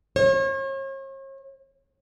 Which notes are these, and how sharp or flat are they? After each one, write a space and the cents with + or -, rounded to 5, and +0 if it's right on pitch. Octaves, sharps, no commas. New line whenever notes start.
C#5 -40